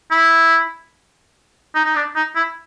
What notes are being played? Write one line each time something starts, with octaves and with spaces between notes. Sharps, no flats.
E4
D#4
D#4
D4
D#4
E4